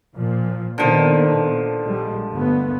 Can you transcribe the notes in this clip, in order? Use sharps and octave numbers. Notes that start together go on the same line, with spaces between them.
A#2 F3
A#2 D3 D#3 F3 B3
A#1 G3 G#3
G1 A3 B3